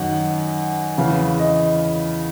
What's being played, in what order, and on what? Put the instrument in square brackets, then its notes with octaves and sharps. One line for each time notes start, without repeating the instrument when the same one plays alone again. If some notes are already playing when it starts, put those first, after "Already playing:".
Already playing: [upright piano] F#2 D#3 F#5
E2 C#3 E3 F5
D#5